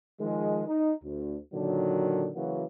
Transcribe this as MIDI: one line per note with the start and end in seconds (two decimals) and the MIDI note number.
0.21 0.63 51
0.21 0.63 53
0.21 0.63 56
0.68 0.93 63
1.04 1.37 38
1.54 2.30 46
1.54 2.30 50
1.54 2.30 51
1.54 2.30 54
2.36 2.65 49
2.36 2.65 52
2.36 2.65 54
2.36 2.65 58
2.36 2.65 66